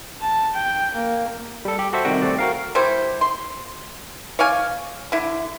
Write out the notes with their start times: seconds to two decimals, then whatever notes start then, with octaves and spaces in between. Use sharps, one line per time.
0.21 A5
0.53 G5
0.94 A#3
1.65 G3 A4
1.79 G4
1.93 F#4 A4 C5 E5
2.05 C3 D#3 G3 F#4 G5
2.22 A3 C4 D5
2.39 F#4 A#4 F5
2.75 G3 A3 E4 C5
3.21 C6
4.39 C#5 D5 F5 G#5
5.12 D3 E4